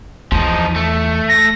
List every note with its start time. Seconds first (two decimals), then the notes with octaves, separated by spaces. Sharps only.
0.32 E2 F3 D#4
0.76 A3
1.29 A#6